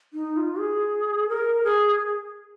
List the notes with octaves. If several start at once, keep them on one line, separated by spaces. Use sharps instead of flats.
D#4
F4
G#4
A#4
G#4